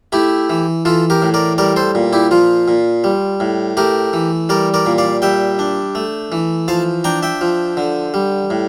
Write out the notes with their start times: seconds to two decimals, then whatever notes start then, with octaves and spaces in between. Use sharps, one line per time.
0.12 A3 E4 G4
0.50 E3
0.85 E3 F4 A4
1.10 G4 A#4
1.22 A2
1.34 A#4 D5
1.58 G3 A#4 D5
1.76 A4 C5
1.95 A#2
2.13 E4 G4
2.31 F3 F4
2.68 A#2
3.04 G3
3.40 A2
3.77 A3 G4 A#4
4.13 E3
4.49 G3 A#4 D5
4.74 A#4 D5
4.86 A#2
4.98 D5 F5
5.22 G3 E5 G5
5.59 D4
5.95 A3
6.32 E3
6.68 F3 F5 A5
7.04 D4 G5 A#5
7.23 E5 G5
7.41 F3
7.77 D3
8.14 G3
8.50 A2